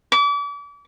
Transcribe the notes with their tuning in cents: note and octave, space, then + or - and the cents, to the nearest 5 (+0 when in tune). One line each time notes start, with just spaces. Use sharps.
D6 -35